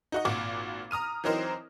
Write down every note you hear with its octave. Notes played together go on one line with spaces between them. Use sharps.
D#4 F#4 D#5
G#1 A#2 F#4 D6
A#5 D#6 F6 D#7
E3 F#3 C4 D#4 A#4 C5